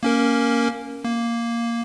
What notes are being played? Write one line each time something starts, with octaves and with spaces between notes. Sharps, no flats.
A#3 C#4 A#4
A#3